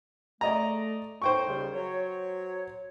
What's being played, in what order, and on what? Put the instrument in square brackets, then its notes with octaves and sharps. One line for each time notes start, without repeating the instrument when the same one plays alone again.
[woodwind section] A3 [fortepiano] D5 D#5 A#5
[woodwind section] A2 D#4 [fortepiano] C5 G5 C#6
[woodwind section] D#2 C#3 G3
F#3 C#5